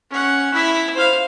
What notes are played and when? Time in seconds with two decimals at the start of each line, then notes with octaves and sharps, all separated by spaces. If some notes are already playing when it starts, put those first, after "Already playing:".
0.10 C#4 F#5
0.53 E4 E5
0.95 C5 F5